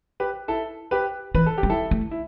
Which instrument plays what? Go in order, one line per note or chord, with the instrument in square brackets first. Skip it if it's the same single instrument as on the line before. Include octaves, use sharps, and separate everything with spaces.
[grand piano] G4 B4
E4 A4
G4 B4
[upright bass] E3 [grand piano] B4
[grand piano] A4
G4
[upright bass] G3
[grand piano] E4 A4
[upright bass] A3
[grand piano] E4